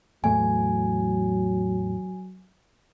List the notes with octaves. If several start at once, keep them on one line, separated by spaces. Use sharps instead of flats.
E2 A2 F#3 A3 G#5